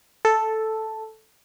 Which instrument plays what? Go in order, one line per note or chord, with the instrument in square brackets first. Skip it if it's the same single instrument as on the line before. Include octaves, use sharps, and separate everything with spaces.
[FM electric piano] A4